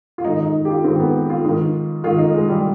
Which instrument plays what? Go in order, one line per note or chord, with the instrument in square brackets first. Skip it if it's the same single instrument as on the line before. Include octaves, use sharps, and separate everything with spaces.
[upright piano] F4
G#2 D#3 D#4
D#4
G4
F4
G#2 D#3 C4
B3
F4
G#2 D#3
G#2 D#3 F4
D#4
G#3
G3